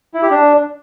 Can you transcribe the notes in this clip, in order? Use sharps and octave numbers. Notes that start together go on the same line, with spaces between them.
E4
G4
D4